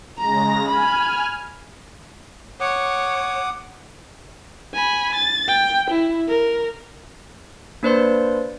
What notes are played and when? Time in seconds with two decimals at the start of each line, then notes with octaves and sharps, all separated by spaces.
0.19 C#3 G#3 A#5 A#6
0.68 G#5 B5 F6
2.60 C#5 F#5 D6 D#6
4.74 G#5 B5
5.15 A6
5.48 G5
5.90 E4
6.28 A#4
7.83 A#3 D4 B4 C5 D5 C6